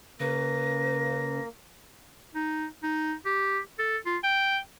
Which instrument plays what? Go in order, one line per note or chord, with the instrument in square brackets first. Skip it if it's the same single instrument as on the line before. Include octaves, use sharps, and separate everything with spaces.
[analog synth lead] C#3 [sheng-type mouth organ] A#3 [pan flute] B4 [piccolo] A#6
[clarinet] D#4
D#4
G4
A4
F4
G5